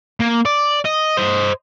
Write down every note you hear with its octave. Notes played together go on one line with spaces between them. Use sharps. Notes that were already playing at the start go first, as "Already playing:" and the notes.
A#3
D5
D#5
C5 D#5